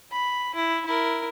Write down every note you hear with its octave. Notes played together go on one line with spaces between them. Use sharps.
B5
E4
E4 A#4